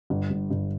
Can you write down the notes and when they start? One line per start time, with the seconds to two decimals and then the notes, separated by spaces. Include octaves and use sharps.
0.10 G1
0.30 G1
0.51 G1